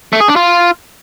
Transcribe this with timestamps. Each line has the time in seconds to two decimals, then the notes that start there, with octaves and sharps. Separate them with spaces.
0.13 A3
0.21 G#4
0.28 D4
0.36 F4